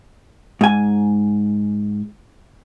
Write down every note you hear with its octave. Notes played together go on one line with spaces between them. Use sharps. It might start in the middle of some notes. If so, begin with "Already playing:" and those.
G#2 G#5